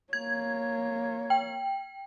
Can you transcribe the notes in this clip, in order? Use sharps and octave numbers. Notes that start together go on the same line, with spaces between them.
A#3 C#5 G#6
G5